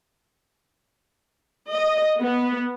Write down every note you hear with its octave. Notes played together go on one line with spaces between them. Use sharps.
D#5
B3